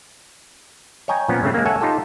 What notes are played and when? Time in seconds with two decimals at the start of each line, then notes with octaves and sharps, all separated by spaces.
1.08 C#5 D#5 G5 G#5 A#5
1.28 A#2 F3 B3 C#4
1.42 G2 C#3 A3 C4
1.54 G#3 A#3
1.66 A4 C#5 E5 F#5 G#5
1.81 D#4 F4 G4 A4